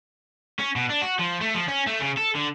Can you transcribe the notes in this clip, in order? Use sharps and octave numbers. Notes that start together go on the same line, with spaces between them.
C#4
B2
D4
F#4
F3
A3
F3
C#4
A3
C#3
A4
D3